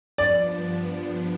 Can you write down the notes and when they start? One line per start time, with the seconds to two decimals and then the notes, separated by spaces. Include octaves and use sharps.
0.18 G2 F3 B3 D4 D5